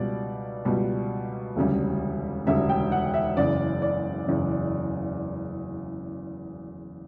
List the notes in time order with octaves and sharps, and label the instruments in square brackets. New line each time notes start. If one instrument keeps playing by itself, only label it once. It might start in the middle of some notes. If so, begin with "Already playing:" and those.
Already playing: [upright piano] C#2 B2 G3 D5
C#2 B2 G3
E1 D2 C#3 G3
E1 D2 C#3 G3 E5
G5
F#5
E5
F#1 E2 C#3 D5
D5
F#1 E2 C#3